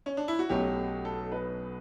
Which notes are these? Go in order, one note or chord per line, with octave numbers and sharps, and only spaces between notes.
C#4
D4
E4
F#4
B1 B2 F#3 A3 C#4 G4
A4
B4